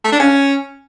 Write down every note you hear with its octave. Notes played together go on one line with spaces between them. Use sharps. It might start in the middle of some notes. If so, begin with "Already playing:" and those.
A3
D4
C#4